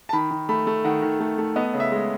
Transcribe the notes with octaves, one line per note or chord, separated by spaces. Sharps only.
A5
D#3 B5
D#3
A3 B5
A3
D#3 F#5
D#3
A3
A3
B3 D#5
C#3
E5
G#3